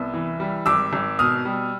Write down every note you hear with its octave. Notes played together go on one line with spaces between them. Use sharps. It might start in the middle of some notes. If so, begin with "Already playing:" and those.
Already playing: C2 B3 E6
E3
G3
G#1 D6 E6
G#1
B2 D#6 F6
G3